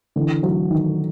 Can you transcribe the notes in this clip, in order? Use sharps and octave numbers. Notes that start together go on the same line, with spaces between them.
D3 E3
E3 F#3
D#3